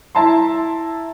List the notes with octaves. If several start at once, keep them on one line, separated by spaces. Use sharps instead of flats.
E4 E5 A5 A#5 C6